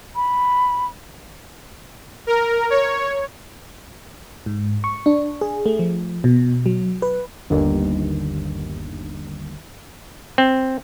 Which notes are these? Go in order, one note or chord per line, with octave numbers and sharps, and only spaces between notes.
B5
A#4
C#5
G#2
C#6
D4
G#4
A3
F3
B2
F#3
B4
G1 D#2
C4